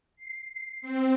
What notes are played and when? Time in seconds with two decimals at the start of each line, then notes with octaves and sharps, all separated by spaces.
0.16 C7
0.82 C4